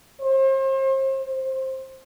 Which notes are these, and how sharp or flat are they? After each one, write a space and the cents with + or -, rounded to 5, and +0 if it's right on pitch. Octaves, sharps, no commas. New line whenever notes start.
C5 +40
C5 +10